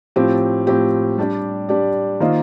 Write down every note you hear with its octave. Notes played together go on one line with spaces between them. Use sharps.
A2 F3 C4 G4
A2 F3 C4 G4
G3 D4 G4 D5
G3 D4 G4 D5
D#3 A#3 F4 C5 D#5